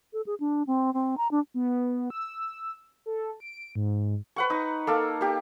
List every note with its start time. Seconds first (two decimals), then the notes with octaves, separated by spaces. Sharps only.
0.13 A4
0.26 G#4
0.40 D4
0.67 C4
0.94 C4
1.17 A#5
1.31 D4
1.54 B3
2.10 E6
3.06 A4
3.40 D7
3.75 G#2
4.36 B4 F#5 C#6
4.50 D#4
4.87 A#3 A4 F5
5.21 A#3 G4